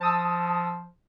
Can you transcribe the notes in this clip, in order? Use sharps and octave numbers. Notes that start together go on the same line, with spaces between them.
F3 A5 D#6 E6